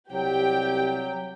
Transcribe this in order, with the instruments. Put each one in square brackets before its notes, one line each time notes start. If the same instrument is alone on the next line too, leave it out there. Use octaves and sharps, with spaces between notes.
[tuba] C2 [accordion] F#3 [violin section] G4 G5